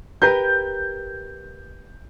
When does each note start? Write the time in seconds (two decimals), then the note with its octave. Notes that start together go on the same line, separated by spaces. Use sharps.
0.22 G4 A#4 B4 G6